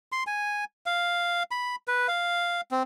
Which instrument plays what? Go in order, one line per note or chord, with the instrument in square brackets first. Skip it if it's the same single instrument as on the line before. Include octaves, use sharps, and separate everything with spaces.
[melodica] C6
G#5
F5
B5
B4
F5
C4